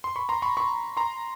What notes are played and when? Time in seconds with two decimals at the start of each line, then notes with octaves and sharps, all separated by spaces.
0.04 C6
0.16 B5 C#6
0.29 A#5 C6
0.42 B5 C#6
0.57 B5 C#6
0.97 A#5 C6